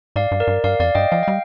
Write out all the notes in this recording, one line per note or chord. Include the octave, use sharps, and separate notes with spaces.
G#2 D5 F5
G2
A#4 D5
G2
G2 D5 F5
F2 D5 F5
G2 D#5 G5
F3 F5
G3 G5